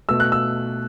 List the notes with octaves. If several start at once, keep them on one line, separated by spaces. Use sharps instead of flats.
B2 A3 E6
F#6
E6